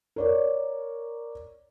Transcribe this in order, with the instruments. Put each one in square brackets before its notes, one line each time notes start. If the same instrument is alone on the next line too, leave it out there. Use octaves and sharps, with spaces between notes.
[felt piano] A#4 C#5 D5